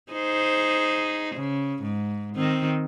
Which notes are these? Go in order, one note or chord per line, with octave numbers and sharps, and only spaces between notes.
D#4 G#4 C5
C#3
G#2
D#3 C4